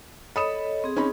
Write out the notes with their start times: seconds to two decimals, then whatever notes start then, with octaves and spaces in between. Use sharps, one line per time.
0.36 A4 C#5 D#5 B5 D#6 E7
0.84 C4 G#4
0.97 C#4 D#4 B5